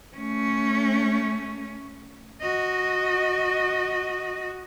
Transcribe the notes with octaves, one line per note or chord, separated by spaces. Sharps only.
A3 C#4
F#4 D#5